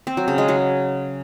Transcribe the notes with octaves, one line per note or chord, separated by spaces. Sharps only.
C4
F#3
C#3
G#3
F#3